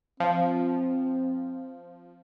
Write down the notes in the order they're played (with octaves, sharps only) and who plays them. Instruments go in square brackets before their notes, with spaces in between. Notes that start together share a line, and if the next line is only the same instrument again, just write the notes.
[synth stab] F3 [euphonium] C4